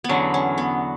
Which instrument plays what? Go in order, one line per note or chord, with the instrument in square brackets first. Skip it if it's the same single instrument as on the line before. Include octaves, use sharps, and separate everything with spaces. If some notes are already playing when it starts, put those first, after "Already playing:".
[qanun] B3
[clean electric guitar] E2 D3 F#3 [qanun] C#4
[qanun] C#4
B3